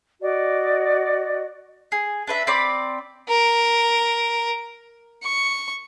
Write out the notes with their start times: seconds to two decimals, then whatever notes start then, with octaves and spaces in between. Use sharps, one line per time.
0.20 F#4 D5 D#5
1.92 G#4
2.27 D4 B4 E5
2.47 C4 D5 B5 D6
3.29 A#4
5.23 C#6